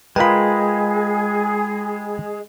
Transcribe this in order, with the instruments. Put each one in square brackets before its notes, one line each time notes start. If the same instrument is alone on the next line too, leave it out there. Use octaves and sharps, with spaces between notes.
[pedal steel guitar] G#3 [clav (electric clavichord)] F4 A#4 B4 [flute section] G#4 [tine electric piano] G5 B5